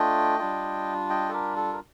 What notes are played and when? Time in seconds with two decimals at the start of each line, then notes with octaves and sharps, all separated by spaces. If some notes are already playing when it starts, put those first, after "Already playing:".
Already playing: A3 D4 F4 D#5 G5
0.39 G3 D4 F4
1.10 D#5 G5
1.29 A4
1.33 G4 A#4
1.56 A4
1.73 A#4